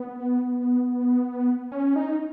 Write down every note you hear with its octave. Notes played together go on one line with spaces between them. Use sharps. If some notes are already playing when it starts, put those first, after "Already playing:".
Already playing: B3
C#4
D#4